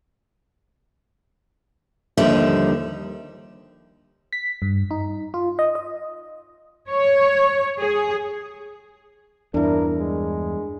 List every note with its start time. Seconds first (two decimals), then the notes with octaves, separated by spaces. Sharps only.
2.17 D#2 D3 F3 G3 D#4 E5
4.33 B6
4.62 G2
4.91 D#4
5.34 F4
5.59 D#5
5.75 D#5
6.89 C#5
7.79 G#4
9.54 E2 G2 D4 E4 A#4
9.99 G#3